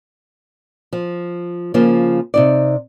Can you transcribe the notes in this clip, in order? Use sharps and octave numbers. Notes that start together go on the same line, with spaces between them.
F3
C#3 F3 A#3 F4
C3 D#4 D5